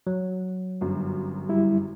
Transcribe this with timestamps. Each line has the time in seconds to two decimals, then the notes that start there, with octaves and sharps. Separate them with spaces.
0.07 F#3
0.81 G1 F#2
1.49 G3 E4